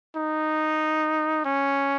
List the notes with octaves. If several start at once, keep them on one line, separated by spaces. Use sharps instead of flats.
D#4
C#4